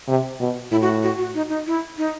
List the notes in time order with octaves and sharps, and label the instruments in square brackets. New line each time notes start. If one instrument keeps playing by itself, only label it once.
[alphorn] C3
B2
[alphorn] A2 [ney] E4
[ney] F#4
F#4
F#4
D#4
D#4
E4
D#4